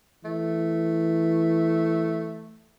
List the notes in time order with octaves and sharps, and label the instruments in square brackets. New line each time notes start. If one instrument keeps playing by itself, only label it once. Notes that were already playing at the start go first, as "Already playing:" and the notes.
[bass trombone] E3 [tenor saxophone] A3